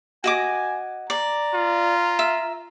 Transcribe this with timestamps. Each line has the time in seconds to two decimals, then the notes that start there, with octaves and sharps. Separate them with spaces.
0.24 F#4 D#5 G#5 D6
1.10 D5 A#5
1.54 F4
2.19 E5